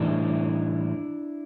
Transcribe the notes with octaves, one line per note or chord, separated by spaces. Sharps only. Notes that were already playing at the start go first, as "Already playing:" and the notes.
Already playing: A2 E3 G3 D4 E4